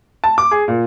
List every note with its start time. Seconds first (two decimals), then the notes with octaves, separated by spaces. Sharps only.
0.24 A5
0.38 D6
0.51 G#4
0.68 A#2